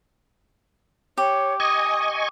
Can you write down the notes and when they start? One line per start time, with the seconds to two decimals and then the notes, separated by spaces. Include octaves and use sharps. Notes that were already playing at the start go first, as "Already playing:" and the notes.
1.18 G4 C#5
1.60 D#5 G#5 C#6 D#6